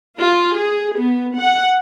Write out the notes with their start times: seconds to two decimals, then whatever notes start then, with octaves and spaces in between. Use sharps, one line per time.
0.19 F4
0.55 G#4
0.96 B3
1.36 F#5